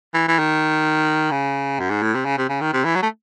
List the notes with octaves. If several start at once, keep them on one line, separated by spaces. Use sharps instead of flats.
E3
E3
D#3
C#3
F#2
G#2
A2
C3
C#3
C3
C#3
D#3
C3
E3
F#3
A3